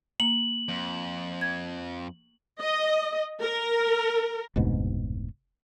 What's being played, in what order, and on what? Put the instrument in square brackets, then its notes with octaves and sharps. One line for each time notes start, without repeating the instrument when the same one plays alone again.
[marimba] A#3 [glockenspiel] F#7
[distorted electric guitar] F2
[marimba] G#6
[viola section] D#5
A#4
[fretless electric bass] F1 D2 G#2 B2